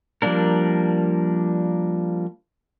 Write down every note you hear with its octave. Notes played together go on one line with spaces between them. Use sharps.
F3 G3 A#3 D4 A#4